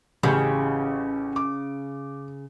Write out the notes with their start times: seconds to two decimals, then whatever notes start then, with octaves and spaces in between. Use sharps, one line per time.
0.23 A1 C#3 G4 G6
1.36 D6